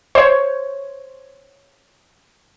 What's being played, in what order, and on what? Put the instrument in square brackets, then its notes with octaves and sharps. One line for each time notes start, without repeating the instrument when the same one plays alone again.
[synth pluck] C5 C#5